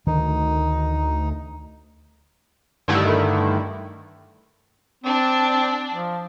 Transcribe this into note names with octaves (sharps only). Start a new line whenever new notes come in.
D2 D#3 D#4
G2 D3 D#3 A3 E4
C4 D4
F3